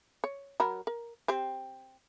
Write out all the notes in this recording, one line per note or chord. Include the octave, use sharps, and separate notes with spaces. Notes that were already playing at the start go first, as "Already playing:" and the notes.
C#5
F#3 A#4 B5
A#4
C4 G4 C5